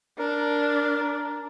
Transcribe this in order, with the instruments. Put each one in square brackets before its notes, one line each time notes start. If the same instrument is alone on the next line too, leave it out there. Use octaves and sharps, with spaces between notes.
[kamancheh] D4 [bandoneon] A#4